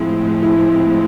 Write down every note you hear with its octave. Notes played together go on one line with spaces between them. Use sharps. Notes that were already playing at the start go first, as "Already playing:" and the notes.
Already playing: A2 F3 G#3 C4 E4
E4